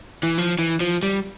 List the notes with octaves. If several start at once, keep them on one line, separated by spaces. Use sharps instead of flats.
E3
F3
E3
F3
G3